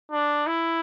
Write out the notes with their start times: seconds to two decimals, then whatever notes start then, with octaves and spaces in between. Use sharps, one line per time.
0.12 D4
0.47 E4